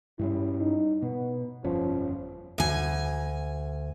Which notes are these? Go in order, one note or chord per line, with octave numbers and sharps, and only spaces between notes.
G2 G3 C#4 E4
D#4
B2 B3
G1 F2 F3 C#4
D2 G#5